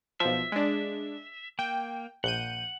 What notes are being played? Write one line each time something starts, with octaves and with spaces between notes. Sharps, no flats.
B1 F3 E5
G#3 D4
A#3 G5
A#1 F#5 G6 D#7